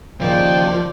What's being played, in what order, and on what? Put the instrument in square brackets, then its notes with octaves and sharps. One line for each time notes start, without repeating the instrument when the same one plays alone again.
[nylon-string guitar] D#2 C#3 [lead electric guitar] F3 [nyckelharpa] D5 [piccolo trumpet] G5